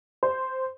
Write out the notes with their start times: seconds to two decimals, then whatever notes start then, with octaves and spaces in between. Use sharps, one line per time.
0.23 C5